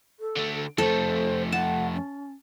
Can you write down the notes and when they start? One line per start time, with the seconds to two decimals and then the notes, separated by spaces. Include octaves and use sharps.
0.20 A4
0.36 D3 A3
0.78 F2 A3 A4 C5
1.52 F#5 A5
1.95 C#4